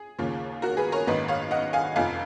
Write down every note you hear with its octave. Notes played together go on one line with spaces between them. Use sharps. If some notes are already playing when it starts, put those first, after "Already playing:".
Already playing: G#4
D#2 C#3 F3 A#3
F#4 A#4
G#4 B4
A#4 C#5
G#1 F#2 D#3 A#3 B4 D#5
C#5 F5
D#5 F#5
F5 G#5
F1 F2 F3 F5 G#5